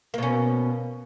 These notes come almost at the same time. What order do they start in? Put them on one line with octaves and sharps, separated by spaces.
A#3 B2 C#4